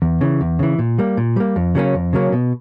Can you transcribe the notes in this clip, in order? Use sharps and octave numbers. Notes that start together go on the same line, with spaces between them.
E2
C#3 E3
E2
C#3 E3
A#2
G3 A#3
A#2
G3 A#3
F2
C#3 F#3 A#3 C#4
F2
C#3 F#3 A#3 C#4
B2